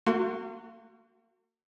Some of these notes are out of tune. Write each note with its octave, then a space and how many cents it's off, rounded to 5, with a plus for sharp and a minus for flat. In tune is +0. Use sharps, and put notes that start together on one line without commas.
A#3 -40 F#4 +0 C6 +10